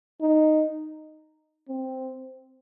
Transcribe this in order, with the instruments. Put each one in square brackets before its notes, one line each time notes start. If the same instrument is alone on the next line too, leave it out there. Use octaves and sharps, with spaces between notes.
[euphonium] D#4
C4